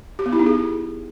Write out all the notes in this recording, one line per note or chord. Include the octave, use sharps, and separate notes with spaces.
G4
B3
E4
D#4
G#4